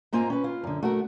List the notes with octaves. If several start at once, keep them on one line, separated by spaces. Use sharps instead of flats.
G#2 A#3 C4 F4 G#5 A#5
C#4 B4
F4
F#2 D3
A3 F#4 A#4